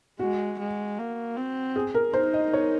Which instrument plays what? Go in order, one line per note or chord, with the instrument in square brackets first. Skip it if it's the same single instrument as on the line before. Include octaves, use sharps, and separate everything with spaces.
[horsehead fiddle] G#3 [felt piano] F#4
[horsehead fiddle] G#3
A#3
C4
[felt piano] G#4
A#4
[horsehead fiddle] D#4 [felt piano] C5
[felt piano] D#5
C#5